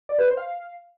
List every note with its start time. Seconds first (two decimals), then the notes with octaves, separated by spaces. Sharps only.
0.09 D5
0.18 B4
0.28 C5
0.37 F5